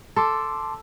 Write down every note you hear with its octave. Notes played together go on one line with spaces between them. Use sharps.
A4 A5 C6 D6